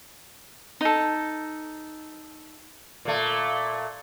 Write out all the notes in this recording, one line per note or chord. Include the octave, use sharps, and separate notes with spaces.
D#4 A4
A#2 A3